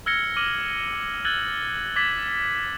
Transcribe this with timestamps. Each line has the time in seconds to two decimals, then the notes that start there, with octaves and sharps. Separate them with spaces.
0.06 E6 F6 G#6 A#6 C#7 G7
0.37 D6 F6 D#7 F#7
1.25 E6 F#6 G#6 A6 F#7 G7
1.96 D6 G#6 A6 B6 F#7